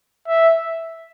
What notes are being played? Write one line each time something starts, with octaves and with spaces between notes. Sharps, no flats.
E5